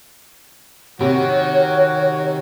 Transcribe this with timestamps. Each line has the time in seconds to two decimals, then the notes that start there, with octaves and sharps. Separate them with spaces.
1.01 C3 D#3 F#4 C#5